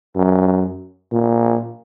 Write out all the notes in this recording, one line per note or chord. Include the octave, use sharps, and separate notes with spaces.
F#2
A#2